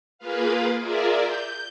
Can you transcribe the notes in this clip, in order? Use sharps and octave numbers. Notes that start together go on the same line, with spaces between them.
A#3 F4 G#4 B4 F5
F4 G#4 A#4 D5 E5
G6